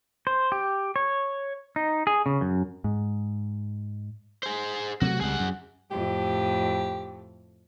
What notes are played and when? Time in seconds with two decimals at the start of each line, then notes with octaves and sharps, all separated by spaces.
0.27 C5
0.52 G4
0.96 C#5
1.76 D#4
2.07 G#4
2.26 C#3
2.41 F#2
2.84 G#2
4.43 G#4 C5
5.01 C3 F#3 A3 F#4
5.21 C#2 G3 G#4 F#5
5.40 F#2
5.91 F2 A2 G4